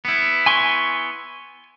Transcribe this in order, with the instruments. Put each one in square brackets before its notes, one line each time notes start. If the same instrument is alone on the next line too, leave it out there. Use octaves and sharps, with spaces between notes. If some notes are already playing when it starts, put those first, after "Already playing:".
[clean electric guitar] B3 E4
[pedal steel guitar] G#5 C6 C#6